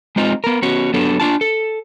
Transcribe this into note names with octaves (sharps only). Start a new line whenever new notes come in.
G#3 C4 D#4 F4
B3 A#4
B3 C#4 F#4
F#3 B3 D4 A4
D4 F4 A5
A4